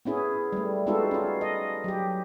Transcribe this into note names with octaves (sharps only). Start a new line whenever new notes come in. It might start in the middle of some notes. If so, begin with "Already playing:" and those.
B3 C#4 E4 G#4
G3 A3
G#3 B3 D#4 F4 F#4 A4
C#4 F4
D#5
F#3 G4